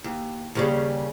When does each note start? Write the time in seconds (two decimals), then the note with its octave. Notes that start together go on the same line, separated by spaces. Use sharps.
0.04 D#2
0.55 D#2 C#3 G3